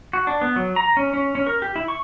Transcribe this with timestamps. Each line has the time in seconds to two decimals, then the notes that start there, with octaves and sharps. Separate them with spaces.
0.13 F#4
0.27 D4
0.42 B3
0.56 F#3
0.76 A#5
0.97 C#4
1.14 C#4
1.35 C#4
1.47 A#4
1.62 G4
1.76 E4
1.88 C#6